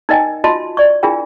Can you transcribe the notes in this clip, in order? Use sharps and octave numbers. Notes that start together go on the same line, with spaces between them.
D#4 A#4 D#5 G5 G#5
F4 F#4 D#5 A5 C6
D5 C#6
D4 E4 F4 G#4 A#4 G5